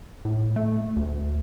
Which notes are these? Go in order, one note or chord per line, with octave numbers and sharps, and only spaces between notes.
A2
A3
D2